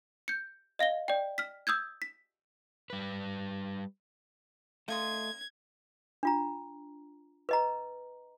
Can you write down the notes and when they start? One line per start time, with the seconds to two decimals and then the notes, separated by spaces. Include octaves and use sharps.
0.28 G6 C#7
0.79 D#5 F5 A#6 G7
1.08 D5 G5
1.38 F6 B6
1.67 D#6 E6 G6 G#6
2.02 B6
2.90 G3 B4
4.88 A3 F4 D#5 C6 G#6
6.23 D4 F4 A#5
7.49 B4 D#5 A#5